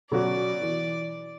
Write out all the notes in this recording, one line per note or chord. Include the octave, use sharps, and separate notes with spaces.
B2 F#3 C#4 F#4 D5
E3